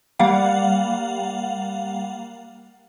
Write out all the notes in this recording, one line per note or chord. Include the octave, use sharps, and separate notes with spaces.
G3 A#3 F5 F#5